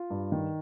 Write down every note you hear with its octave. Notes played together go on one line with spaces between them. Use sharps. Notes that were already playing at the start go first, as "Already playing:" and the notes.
Already playing: F4
G2
D#3